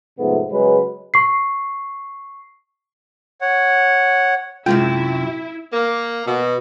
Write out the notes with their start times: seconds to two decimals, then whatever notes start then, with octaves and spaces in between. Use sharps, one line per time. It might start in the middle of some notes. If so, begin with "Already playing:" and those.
0.19 F2 G#2 C3 A3 B3
0.51 C#3 F#3 G#3 B4
1.14 C#6 C7
3.41 C#5 F#5
4.66 F#2 C3 F#3 G#3 E4 F4 G5
5.73 A#3
6.26 B2